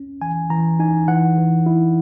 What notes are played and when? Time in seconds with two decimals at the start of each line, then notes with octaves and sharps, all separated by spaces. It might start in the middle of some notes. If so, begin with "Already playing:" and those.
Already playing: C#4
0.21 E3 G#5
0.50 E3 A#5
0.80 D#4 G#5
1.08 E3 F#5
1.37 E3
1.66 E4